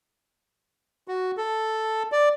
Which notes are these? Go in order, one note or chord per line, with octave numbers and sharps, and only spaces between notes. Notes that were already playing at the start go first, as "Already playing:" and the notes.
F#4
A4
D5